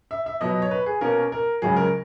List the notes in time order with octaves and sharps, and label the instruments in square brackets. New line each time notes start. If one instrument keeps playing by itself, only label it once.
[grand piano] E5
E5
B2 F#3 B3 D#5
C#5
B4
G#4
B2 A#3 C#4 A#4
A#4
C#2 C#3 F#3 G#4
A#4